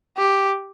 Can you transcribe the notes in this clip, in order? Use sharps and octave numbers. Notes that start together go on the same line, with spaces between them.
G4